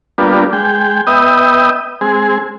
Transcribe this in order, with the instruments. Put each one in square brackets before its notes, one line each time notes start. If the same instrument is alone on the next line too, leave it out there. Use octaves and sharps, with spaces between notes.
[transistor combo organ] G3 A#3 B3 D4 F4
G#3 G5
B3 D#5 E5 G5 D#6
G#3 C4 G#4